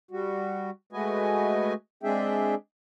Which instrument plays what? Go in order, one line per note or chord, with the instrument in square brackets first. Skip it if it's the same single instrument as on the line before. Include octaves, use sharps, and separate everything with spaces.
[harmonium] G3 F#4
G#3 A3 F#4 B4 D#5 G#5
G#3 C4 D4 G#4 E5 G5